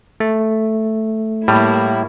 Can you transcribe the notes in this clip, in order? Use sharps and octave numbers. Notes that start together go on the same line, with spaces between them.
A3
A2 G3 A#3 E4